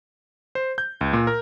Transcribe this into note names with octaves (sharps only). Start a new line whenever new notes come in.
C5
G6
C#2
A#2
A#4